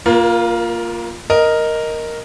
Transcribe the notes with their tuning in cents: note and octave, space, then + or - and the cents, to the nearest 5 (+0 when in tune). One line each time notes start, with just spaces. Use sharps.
A#3 +0 F4 +0 A#4 +40
A#4 +0 D#5 +0